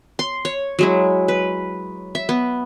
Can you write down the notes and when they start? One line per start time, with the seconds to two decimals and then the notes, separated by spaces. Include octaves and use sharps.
0.19 C6
0.45 C#5
0.79 F#3 G#3 E4
1.28 B4
2.15 E5
2.29 B3